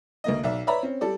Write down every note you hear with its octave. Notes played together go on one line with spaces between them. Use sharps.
D2 A#3 D#5
B1 D5 E5
B4 C#5 D5 E5 A#5 B5
C4 C#4
G3 A4 D5